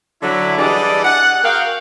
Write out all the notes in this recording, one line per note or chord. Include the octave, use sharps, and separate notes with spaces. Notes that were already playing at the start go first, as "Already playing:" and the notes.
D3 F#3 E4
E3 G3 D4 G#4 D5 D#5
F#5
F#4 G#4 A#4 F5 G5